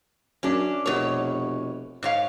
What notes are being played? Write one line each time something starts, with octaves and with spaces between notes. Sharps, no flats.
F#2 C#4 D4
F1 B2 C#5
G#2 C#5 F5